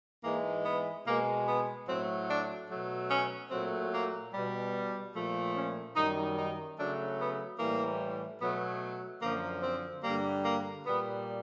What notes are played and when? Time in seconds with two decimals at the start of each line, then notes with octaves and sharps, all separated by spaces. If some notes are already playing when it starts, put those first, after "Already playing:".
0.24 G#2 E3 G#3 A#3
0.65 B3
1.06 B2 G#3 A#3
1.47 B3
1.88 A2 F#3 A3 C4
2.28 D4
2.69 B2 F#3 A3
3.10 C#4
3.51 A#2 F#3 A3 C4
3.92 A#3
4.33 B2 G3
5.14 A#2 F3 A3
5.56 C#4
5.95 F#2 D#3 G3 D#4
6.36 D#4
6.78 C#3 F#3 A3 D4
7.19 B3
7.59 A2 E3 G3 A#3
8.41 B2 F#3 A3 B3
9.22 F#2 D3 F3 A#3
9.63 C4
10.04 G2 D3 G3 A#3
10.44 A#3
10.86 A#2 G3 B3